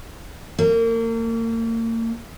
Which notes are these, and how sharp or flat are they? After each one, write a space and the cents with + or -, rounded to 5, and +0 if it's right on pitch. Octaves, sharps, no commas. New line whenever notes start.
A#3 -35